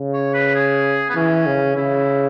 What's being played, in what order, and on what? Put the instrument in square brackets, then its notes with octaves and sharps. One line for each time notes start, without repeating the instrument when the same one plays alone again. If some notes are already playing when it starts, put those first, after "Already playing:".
Already playing: [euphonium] C#3
[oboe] C#5
B4
G#4
B3
[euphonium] E3 [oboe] C#4
[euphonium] C#3
[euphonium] C#3 [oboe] E4